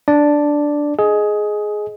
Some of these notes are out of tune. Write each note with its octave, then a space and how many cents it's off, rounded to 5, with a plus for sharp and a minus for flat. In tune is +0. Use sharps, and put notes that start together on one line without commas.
D4 +0 D5 +0
G#4 +15 D#5 +0